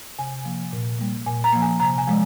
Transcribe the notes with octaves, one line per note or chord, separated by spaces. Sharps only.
C3 G#5
F3 A#3
A#2
G3 A#3
A#2 G#5
A#5
F3 A#3
G#5
C3 A#5
G#5
F3 G#3